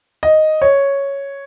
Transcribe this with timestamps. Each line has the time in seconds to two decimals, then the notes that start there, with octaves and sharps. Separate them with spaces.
0.23 D#5
0.62 C#5